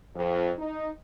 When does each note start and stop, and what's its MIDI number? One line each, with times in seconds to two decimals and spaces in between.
0.15 0.51 41
0.59 0.89 63